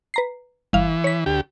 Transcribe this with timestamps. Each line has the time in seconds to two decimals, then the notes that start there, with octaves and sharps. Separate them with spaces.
0.14 B4 A#5 C7
0.73 G1 E3 F5
1.04 C#5 B6
1.26 D2 G4